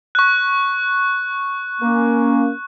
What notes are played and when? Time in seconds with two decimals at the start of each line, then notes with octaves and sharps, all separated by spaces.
0.15 C#6 F#6
1.82 A#3 C#4